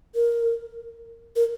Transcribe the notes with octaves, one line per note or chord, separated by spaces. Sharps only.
A#4
A#4